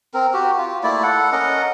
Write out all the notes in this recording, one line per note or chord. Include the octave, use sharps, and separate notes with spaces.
C4 A#4
F#4 G4
F4
A3 A#3 E4 D5
A4 F#5
C#4 A#4 D#5 F#5